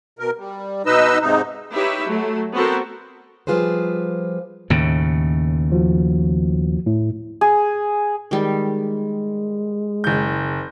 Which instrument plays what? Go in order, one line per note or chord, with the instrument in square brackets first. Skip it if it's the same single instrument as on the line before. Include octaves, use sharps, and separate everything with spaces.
[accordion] B2 A#4
G3
B2 D#4 B4 D#5 E6
G#2 C3 D#4
[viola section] D#4 E4 G4 B4 C#5 E5
F#3 A3
B3 C4 F#4 A4 A#4 C5
[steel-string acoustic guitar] F3 G3 F4 G#4 B4 C5
[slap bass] D#2 A2 C#3
[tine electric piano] F3 F#4
A2
[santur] G#4
[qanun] D#3 G3 [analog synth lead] G#3
[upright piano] F#1 G6